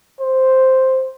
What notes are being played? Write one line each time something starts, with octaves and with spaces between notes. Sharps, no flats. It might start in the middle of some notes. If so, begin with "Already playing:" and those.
C5